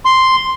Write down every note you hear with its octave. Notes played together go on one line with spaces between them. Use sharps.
C6